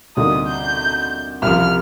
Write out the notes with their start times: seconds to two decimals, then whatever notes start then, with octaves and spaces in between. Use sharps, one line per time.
0.17 D2 C3 G3 A#3 D#4 D#6
0.47 G6
1.42 C2 C3 F3 F6